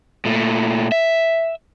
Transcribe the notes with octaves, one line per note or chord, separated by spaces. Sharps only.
A#2 A3
E5